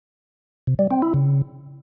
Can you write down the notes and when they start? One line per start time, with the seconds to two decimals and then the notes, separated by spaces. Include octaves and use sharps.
0.67 C3
0.79 G3
0.91 C4
1.02 E4
1.14 C#3